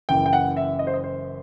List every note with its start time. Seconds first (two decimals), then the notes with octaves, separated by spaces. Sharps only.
0.09 F#1 F#2 E3 G5
0.26 G5
0.33 F#5
0.57 E5
0.79 D#5
0.87 C5
0.94 D#5
1.04 C5